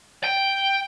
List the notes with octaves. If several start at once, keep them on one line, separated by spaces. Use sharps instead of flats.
G5